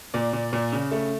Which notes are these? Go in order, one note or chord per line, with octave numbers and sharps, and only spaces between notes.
A#2 D5
A#2
A#2
C#3
A3